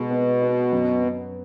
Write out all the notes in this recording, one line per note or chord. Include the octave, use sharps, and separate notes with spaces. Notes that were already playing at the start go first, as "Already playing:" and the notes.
Already playing: B2 G#3 B3
B3
B3
F#2
F#2